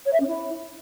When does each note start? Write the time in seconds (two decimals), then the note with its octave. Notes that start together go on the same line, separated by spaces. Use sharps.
0.06 C#5
0.13 E5
0.20 C#4
0.27 E4